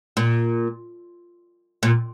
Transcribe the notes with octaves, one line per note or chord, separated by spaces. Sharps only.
A#2
A#2